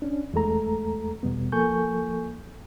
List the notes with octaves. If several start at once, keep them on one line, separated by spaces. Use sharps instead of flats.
C#4 D4
E2 G#3 A3 A4 A#5
E2 B2 G3 B3
F3 A#3 A4 G#5 C#6 G6